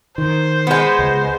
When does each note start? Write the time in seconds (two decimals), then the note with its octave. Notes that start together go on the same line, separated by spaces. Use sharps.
0.18 D#3 C5
0.67 G#3 B3
0.99 C#2